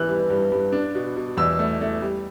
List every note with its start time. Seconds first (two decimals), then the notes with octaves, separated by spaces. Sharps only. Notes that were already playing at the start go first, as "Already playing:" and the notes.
Already playing: E3 F#6 G6
0.09 G3
0.30 G2
0.52 G2
0.73 D4
0.95 B2
1.16 B2
1.37 E2 E6
1.59 A3
1.81 A3
2.02 G3